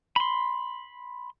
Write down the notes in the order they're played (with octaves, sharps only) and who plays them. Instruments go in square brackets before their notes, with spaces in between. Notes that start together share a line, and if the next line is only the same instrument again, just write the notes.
[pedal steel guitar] B5 C6